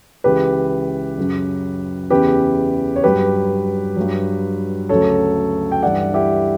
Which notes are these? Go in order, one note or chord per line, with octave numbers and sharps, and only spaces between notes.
C#2 C#3 E3 G4 B4
F#2 C#3 F#3
E2 C#3 E3 G4 B4
C#5
G2 F#3 G4 B4
G2 F#3
D2 C#3 F#3 A4 C#5
G5
G2 E3 D5 F#5
E4 G4